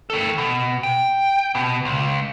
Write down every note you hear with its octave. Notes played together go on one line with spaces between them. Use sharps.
D#3 A4
B2
G5
B2
C#2